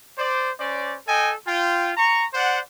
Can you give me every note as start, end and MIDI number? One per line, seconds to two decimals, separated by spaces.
0.18 0.51 72
0.18 0.51 74
0.59 0.96 61
0.59 0.96 72
0.59 0.96 74
1.08 1.33 69
1.08 1.33 75
1.08 1.33 79
1.08 1.33 80
1.47 1.92 65
1.47 1.92 79
1.97 2.24 82
1.97 2.24 85
2.34 2.60 72
2.34 2.60 74
2.34 2.60 78